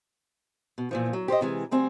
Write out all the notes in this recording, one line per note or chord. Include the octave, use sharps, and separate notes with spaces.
B2
A#2 E3 F3
F#3
G4 C5 D5 D#5
C3 E3 G#3
D2 G3 C4 G#5